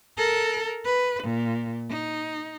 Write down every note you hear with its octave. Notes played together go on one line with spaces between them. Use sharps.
A4 A#4
B4
A#2
D#4